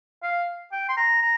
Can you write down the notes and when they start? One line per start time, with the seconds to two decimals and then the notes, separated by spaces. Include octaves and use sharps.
0.23 F5
0.72 G5
0.89 C6
0.97 A#5
1.22 A#5